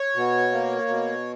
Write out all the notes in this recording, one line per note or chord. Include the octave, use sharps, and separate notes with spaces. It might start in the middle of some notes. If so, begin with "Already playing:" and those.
Already playing: C#5
B2
A#3
B2